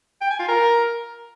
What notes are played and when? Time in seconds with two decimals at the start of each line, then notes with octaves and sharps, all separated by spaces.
0.21 G5
0.30 G#5
0.39 F4
0.48 A#4